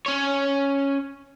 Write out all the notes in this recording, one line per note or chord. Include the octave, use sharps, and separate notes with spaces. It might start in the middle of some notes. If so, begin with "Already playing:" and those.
C#4 C#5